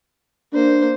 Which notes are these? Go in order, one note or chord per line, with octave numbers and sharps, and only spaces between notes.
A#3 D4 C5